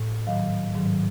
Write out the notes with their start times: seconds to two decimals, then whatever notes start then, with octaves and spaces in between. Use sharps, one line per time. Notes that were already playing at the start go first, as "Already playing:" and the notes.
Already playing: A2
0.27 G#2 D#3 F#3 D#5 F5
0.75 G#2 D#3 F#3